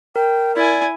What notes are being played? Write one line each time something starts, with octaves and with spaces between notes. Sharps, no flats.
A#4 G5
E4 D5 G#5